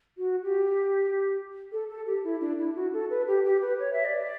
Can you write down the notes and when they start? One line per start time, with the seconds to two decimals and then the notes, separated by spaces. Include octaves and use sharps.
0.18 F#4
0.43 G4
1.72 A4
1.90 A4
2.07 G4
2.24 E4
2.41 D4
2.59 E4
2.75 F#4
2.93 A4
3.10 B4
3.27 G4
3.45 G4
3.61 B4
3.79 C#5
3.93 E5
4.05 D5